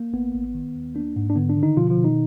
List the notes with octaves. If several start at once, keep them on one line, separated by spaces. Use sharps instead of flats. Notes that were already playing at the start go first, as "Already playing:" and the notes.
Already playing: A#3
G#1 B3
G#1
D#3
D#2
A#3 D4
G#2
D4
D3 B3
D4
D3
D#3 D#4
B2 F3 F4
F3 F4
B2
D#3 D#4